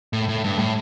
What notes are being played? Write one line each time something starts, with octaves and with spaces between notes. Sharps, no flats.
A2
A2
G2
A2